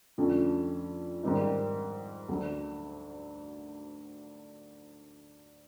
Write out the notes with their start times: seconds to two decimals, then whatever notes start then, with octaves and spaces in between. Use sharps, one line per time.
0.18 F2 D3 F3 A3 C#4
1.23 G#2 D#3 G3 C4 D#4
2.28 D2 D3 F#3